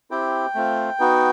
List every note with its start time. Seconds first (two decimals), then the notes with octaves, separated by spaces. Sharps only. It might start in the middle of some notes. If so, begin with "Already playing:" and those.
0.11 C4 E4 G4 G5
0.55 A3 C4 F4
1.00 B3 D#4 F#4